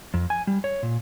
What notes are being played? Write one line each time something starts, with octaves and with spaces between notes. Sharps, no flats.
F2
G#5
G3
C#5
A#2